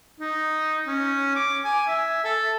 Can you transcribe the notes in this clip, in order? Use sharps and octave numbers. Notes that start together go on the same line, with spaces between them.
D#4
C#4
D6
G#5
E5
A4